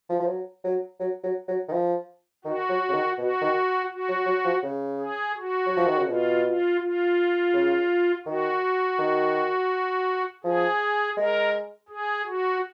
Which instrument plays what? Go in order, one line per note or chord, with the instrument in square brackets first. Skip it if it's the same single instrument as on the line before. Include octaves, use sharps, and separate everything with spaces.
[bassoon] F3
F3
F#3
F#3
F#3
F#3
F#3
D#3
F3
[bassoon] D#3 [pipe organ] F#4
[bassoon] F#3
C#3
D#3
[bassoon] B2 [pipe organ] F#4
[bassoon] D#3
[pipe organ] F#4
[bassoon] F#3
F#3
F3
C#3
[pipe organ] G#4
F#4
[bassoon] F#3
F3
D#3
C#3
[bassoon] B2 [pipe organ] F4
[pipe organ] F4
F4
[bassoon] C#3
[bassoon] D#3 [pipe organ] F#4
[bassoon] D#3
[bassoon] F3 [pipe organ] G#4
[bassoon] G#3 [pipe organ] A#4
[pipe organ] G#4
F#4